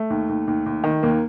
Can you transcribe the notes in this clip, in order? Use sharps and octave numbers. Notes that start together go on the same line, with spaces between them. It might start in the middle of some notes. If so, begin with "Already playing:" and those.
Already playing: A3
D#2
D#2
D#2
D#2
D#3
D#2 A#3